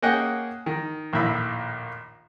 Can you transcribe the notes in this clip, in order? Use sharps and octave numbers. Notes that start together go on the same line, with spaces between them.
A#3 C#4 G#4 D#5 F#5 G5
D#3
A#1 D#2 A2 E5 B5